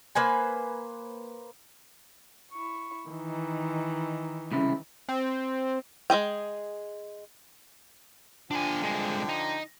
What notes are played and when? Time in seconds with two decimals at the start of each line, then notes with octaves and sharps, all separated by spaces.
0.15 A#3 B4 C5 G#5
2.52 E4 C#6
3.09 D#3 E3 D#4
4.51 C2 C#3 E4
5.09 C4
6.10 G#3 E4 G#4 G5
8.51 D3 F3 D4 G5 G#5
8.83 C2 G#3
9.29 D#4